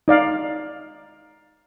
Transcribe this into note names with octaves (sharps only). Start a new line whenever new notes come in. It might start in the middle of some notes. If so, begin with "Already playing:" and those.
D#4 D5 F5